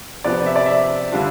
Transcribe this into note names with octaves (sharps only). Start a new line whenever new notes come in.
C3 F3 B3 D5
E5
D5
E5
D3 G3 D4 F4